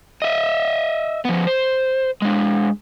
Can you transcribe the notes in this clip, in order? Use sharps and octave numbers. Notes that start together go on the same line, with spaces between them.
D#5 E5
F3 B3
C5
G#3 D4